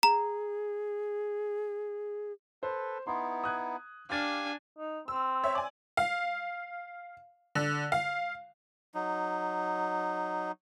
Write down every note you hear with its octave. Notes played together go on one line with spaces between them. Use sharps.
G#4 A#5
A4 B4 C5
B3 D#4 E4 C6
D#6 F#6 G#6
D4 G4 F5 G#5 F6 A6
D#4
C4 E6
C#5 E5
D5 G#5
F5
D3
F5
F#3 D#4